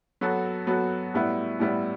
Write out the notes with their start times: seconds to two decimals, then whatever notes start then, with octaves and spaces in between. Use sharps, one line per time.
0.21 F#3 B3 F#4 A4
0.67 F#3 B3 F#4 A4
1.14 A2 G3 B3 E4
1.59 A2 G3 B3 E4